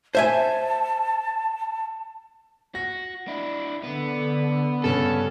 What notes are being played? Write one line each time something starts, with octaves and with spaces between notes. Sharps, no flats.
C5 E5 G#5 A5
F#4 A#6
D4 E4
D3 B3
G2 C#3 C#4 A4